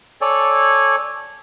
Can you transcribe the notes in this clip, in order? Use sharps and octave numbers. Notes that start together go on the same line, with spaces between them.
A4 C#5 D5 G#5